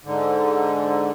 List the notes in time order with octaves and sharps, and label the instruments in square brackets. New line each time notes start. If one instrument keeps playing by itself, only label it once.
[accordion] G#2 D3